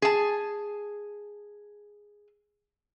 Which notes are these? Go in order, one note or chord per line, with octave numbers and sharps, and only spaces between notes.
G#4 A5